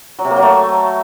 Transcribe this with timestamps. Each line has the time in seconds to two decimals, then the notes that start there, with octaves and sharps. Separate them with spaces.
0.19 F#3
0.25 C3
0.30 A#3
0.36 F#3
0.42 A3